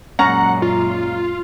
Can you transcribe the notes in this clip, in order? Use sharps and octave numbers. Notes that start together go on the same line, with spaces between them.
F#2 A#2 G#3 C#4 F#5 A#5
F4